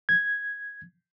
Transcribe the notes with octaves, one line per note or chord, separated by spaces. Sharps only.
G#6